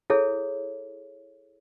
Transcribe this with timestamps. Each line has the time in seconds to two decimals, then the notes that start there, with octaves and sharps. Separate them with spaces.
0.10 E4 G#4 A4 C#5